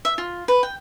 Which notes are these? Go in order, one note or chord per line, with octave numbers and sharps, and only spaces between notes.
E5
F4
B4
G5